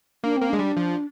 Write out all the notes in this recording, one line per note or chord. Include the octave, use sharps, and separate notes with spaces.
A#3 D4
A#3 C4
G#3 D4
G3
F3